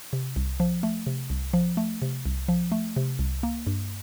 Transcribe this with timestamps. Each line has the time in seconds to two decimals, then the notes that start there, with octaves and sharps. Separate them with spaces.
0.13 C3
0.36 C2
0.60 F3
0.83 A3
1.07 C3
1.30 C2
1.53 F3
1.77 A3
2.02 C3
2.26 C2
2.48 F3
2.72 A3
2.96 C3
3.19 C2
3.43 A#3
3.67 G2